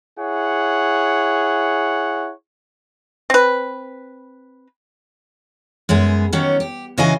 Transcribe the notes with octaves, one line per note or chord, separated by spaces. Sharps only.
E4 G#4 C#5 F#5
C4 B4
F#2 G#3 B3 G#4
D#3 F#3 C#4 G4
G4
C#3 E3 F#4 D#5 F5 G#5